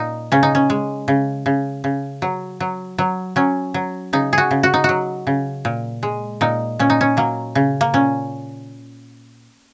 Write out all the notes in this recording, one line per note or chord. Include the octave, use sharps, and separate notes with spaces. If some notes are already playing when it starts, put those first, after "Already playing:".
Already playing: A#2 D#4
C#3 C#4
D#4
C#4
G#3
C#3
C#3
C#3
F#3
F#3
F#3
F#3 C#4
F#3
C#3 D#4
F#4 G#4
C#3
F#4
D#4
F#3 F#4
C#3
A#2
G#3
A#2 D#4
A#2 C#4
D#4
C#4
F#3 A#3
C#3
A#3
A#2 C#4